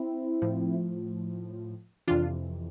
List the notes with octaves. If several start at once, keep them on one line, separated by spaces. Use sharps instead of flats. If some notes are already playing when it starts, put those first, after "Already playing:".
Already playing: C4 E4
A2 F3
F2 C3 E3 D4 F4